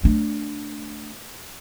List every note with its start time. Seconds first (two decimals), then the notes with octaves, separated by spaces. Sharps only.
0.03 A3 D4